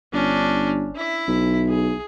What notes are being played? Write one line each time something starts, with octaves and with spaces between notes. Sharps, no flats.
G1 C#4 D4
E4 E5
B1
G#4